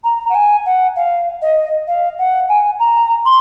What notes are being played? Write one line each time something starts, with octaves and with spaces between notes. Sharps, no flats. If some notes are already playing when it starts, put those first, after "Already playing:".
A#5
F#5
G#5
F#5
F5
D#5
F5
F#5
G#5
A#5
C6